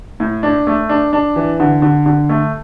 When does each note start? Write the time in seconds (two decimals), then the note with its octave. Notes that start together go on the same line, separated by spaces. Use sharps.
0.20 A2
0.43 D4
0.67 A3
0.89 D4
1.13 D4
1.36 E3
1.60 D3
1.82 D3
2.06 D3
2.29 A3